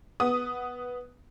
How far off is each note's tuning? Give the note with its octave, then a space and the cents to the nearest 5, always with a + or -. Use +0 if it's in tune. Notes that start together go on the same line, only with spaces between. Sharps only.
B3 +0 D#6 +0